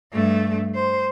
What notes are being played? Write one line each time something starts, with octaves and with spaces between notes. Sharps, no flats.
G2 A3
C5